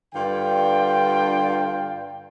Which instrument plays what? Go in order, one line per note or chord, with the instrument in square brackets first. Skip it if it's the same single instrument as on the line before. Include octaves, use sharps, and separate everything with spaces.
[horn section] G2 D3 F4 G5